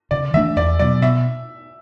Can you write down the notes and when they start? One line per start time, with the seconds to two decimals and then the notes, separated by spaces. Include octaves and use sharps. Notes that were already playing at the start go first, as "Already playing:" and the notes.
0.11 C#3 D5
0.34 E3 A3 D4 E5
0.56 E2 D5
0.79 B2 F#3 D5
1.02 B2 E5